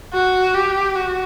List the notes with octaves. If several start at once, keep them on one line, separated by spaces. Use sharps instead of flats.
F#4
G4
F#4